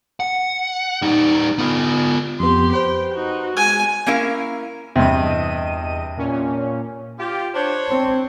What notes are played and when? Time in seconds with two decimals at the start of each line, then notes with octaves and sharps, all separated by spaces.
0.20 F#5
1.02 G3 D#4
1.58 B3 F4
2.40 F2 B3 G4 C6
2.73 B4 C5 G5
3.13 D#4 F#4
3.57 G#3 G#5
4.06 A#3 C#4 E4 A#4 F5
4.96 E2 G2 C3 D#5 D#7
6.17 A#2 C#4
7.18 F4 G4
7.55 D4 C5 C#5
7.89 C4